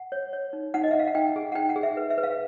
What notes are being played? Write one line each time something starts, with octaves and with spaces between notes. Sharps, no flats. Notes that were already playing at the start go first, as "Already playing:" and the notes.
Already playing: F#5
C#5
C#5
D#4
D#4 F#5
D#5
E5
D#4
F5
F#5
D#4 G5
G#4 G#5
F#5
D#4 G5
F#5
G#4
E5
B4
E5
B4
F5